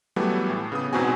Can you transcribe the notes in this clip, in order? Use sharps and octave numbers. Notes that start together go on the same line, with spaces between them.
E3 F#3 G3 A3 B3
A2
C#3 B3 D#6
E2 G#2 B2 C4 F#4 G#5